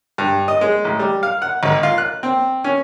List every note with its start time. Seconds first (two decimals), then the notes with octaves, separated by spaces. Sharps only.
0.18 G2
0.48 D#5
0.61 G#3
0.84 A1
0.99 G3
1.23 F5
1.42 F#5
1.63 G#1
1.83 F4
1.98 F#6
2.23 C4
2.64 C#4